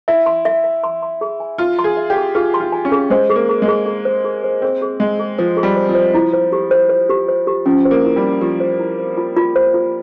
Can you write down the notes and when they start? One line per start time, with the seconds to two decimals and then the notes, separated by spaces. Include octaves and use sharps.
0.08 E4 E5
0.26 C6
0.45 E5
0.64 E5
0.84 C6
1.02 C6
1.21 G#4
1.40 G#5
1.58 F4 C6
1.79 C6
1.84 G#4
1.97 E5
2.10 G4
2.16 G#4
2.35 F4 G#4
2.54 C6
2.60 F4
2.72 G#5
2.85 C#4
2.92 G#4
3.10 G#3 C5
3.30 G#4
3.36 A#3
3.49 G#4
3.62 G#3
3.68 G#4
3.86 G#4
4.05 C5
4.25 G#4
4.44 C5
4.62 C4 G#4
4.82 G#4
5.00 G#3 G#4
5.19 G#4
5.38 F3 C5
5.57 G#4
5.63 G3
5.77 C5
5.89 F3
5.95 C5
6.14 E4
6.33 C5
6.52 G4
6.71 C5
6.89 C5
7.10 G4
7.29 C5
7.47 G4
7.66 F3 C#4
7.85 C5
7.91 A#3
8.04 E4
8.16 G3
8.23 C#4
8.41 F3 G4
8.60 C5
8.79 E4
8.99 C5
9.18 F4
9.37 F4
9.56 C5
9.74 F4